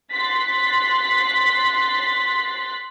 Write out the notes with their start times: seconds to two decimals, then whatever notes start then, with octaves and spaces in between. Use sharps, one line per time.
0.12 C6 F#6 A6 B6